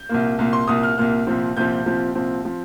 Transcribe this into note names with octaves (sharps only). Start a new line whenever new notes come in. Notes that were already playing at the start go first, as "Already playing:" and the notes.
Already playing: G6
C2 A#2 A#3
C2 A#2 A#3
C6
C2 A#2 A#3 D#6
F6
C2 A#2 A#3 F6
C2 A#2 F3 C4
C2 A#2 F3 C4 G6
C2 A#2 F3 C4
C2 A#2 F3 C4
F3 C4